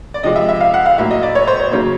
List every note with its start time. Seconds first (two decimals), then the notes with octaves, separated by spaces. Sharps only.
0.14 D5
0.23 C3 F3 G#3 D#5
0.36 E5
0.49 E5
0.61 F5
0.74 F#5
0.86 F5
0.98 A2 F#3 A#3 E5
1.11 D#5
1.23 D5
1.35 C#5
1.47 C5
1.60 C#5
1.71 C#3 F#3 A#3 C#5